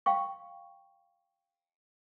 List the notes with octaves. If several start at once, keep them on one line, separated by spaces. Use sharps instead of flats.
F5 G5 C#6